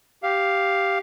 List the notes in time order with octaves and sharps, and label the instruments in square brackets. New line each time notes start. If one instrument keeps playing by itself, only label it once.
[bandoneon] G4 F5